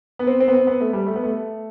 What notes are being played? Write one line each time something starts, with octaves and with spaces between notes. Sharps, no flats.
B3
C4
C4
B3
C4
B3
A3
G3
A3
B3
A3